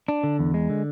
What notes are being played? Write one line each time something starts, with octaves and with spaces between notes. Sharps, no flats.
D4
D3
E2
G#3
D3